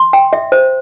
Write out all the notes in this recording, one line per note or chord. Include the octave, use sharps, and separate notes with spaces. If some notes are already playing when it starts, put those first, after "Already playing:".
Already playing: C6
G5
E5
C5